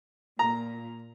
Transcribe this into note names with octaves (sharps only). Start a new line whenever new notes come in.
A#2 A#5